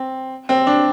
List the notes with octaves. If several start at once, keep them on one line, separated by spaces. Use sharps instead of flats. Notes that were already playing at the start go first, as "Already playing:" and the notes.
Already playing: C4
C4
D4